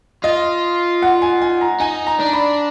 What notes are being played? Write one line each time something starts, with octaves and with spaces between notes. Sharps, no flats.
F4 D#5
F#5
G#5
G#5
A#5
D#4 G#5
A#5
D4
B5